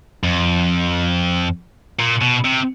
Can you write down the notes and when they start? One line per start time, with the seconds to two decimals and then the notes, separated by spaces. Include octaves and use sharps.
0.24 F2
2.00 A#2
2.22 B2
2.45 C3